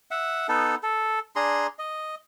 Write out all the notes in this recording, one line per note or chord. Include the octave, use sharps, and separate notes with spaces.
E5 F#5
B3 D#4 A4
A4
D4 G#4 A#5 C6
D#5